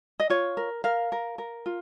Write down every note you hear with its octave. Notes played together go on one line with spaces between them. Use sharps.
D#5
F4 C#5
A#4
A#4 F5
A#4
A#4
F4